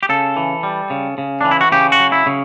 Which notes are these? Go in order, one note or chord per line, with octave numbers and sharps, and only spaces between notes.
G4
C#3 A4
E3
G3
C#3
C#3
E3 D4
E4
F#4
C#3 G4
F#4
F#3
E4
C#3